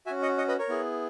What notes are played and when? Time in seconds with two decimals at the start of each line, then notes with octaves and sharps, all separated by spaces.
0.06 F#4 E5 G#5
0.11 C#4
0.22 D#5 F#5
0.38 D#5 F#5
0.48 B4 D#5
0.59 A#4 C#5
0.69 B3 E4 G#4